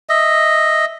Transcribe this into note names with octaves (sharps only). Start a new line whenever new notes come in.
D#5 E5